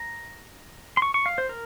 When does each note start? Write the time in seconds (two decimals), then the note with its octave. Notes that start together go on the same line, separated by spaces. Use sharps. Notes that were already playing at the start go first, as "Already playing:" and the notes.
Already playing: A#5
0.97 C6
1.02 C#6
1.14 C#6
1.26 F5
1.38 C5
1.49 A#4